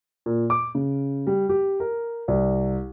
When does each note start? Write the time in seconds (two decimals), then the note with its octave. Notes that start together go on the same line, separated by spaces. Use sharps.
0.26 A#2
0.50 D6
0.75 C#3
1.27 G3
1.49 G4
1.80 A#4
2.28 C2